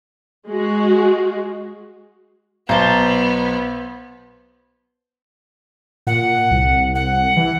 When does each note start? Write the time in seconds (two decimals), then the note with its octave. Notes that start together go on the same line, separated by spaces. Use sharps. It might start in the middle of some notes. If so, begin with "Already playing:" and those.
0.48 G#3 F#4
2.69 B1 B3 C5 A5 A#5
6.07 A#2 F#5
6.51 C2
6.95 F#5
7.37 E3